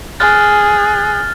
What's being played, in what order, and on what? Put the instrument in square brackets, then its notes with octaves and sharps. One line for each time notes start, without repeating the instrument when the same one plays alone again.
[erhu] G#4 [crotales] F6 F#6 A6